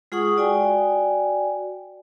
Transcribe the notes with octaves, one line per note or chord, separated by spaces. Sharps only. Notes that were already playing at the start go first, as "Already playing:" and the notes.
G#3 F4 G#4 F#5 C#6 D#6
F#4 D5 G5 G#5